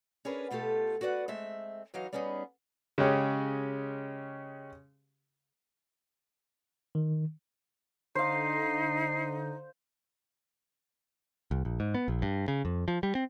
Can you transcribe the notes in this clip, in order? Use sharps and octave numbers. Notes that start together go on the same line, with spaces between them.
C#4 D4 G#4 A#4 B4
B2 A3 F4 G4 A4
F#4 B4 D5 D#5 F#5
G#3 A3 C4 E5
E3 F#3 D#4 F5
G3 B3 C#4 D#4 G#4
C#3 G#3 C#4 G4
D#3
D3 D#4 C5 F5 C7
C2
A#1
G#2
B3
A#1
G2
C#3
F2
F3
G3
C4